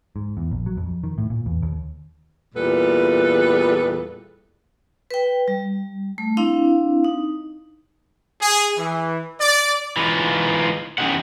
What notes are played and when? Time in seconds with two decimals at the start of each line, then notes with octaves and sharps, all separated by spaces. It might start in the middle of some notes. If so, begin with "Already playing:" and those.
0.16 G#2
0.37 E2
0.51 A#1
0.66 F#3
0.77 F2
1.04 D#3
1.18 A2
1.30 A#2
1.46 E2
1.62 D#2
2.55 E2 A#2 G3 A4 B4
5.11 B4 G5
5.48 G3
6.18 A3
6.37 C4 D4 E4 F5
7.04 D#4
8.41 G#4
8.78 E3
9.40 D5
9.97 E3 G3 G#3 B3 D#4 F4
10.98 E2 C#4 D#4 G4 F#5